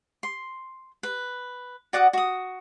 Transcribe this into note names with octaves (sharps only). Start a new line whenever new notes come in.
C6
B4
F#4 D5 F#5 D#6
F#4 D#6